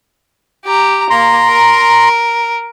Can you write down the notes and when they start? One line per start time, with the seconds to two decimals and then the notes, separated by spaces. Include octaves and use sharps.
0.65 G4 A#5
1.10 A#3 A#5 C6
1.49 A#4